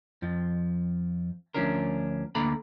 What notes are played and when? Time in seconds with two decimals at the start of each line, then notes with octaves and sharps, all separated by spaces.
0.22 F2 F3
1.55 D2 G#2 F3 C#4 D4 A#4
2.35 D2 D3 A#3 A4 A#5 B5